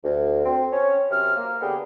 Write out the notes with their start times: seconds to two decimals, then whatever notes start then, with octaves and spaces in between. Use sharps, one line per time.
0.04 D2
0.44 C4
0.72 C#4 C#5
1.10 F#2 C3 F6
1.36 A#3
1.61 D3 B3 G4 G#4